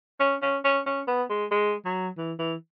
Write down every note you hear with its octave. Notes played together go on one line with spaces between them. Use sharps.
C#4
C#4
C#4
C#4
B3
G#3
G#3
F#3
E3
E3